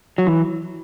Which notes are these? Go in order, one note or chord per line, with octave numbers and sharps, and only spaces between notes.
F#3
E3